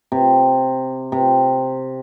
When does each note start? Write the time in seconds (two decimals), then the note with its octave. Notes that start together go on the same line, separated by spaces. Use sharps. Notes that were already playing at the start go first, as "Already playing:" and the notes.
0.12 C3
1.12 C3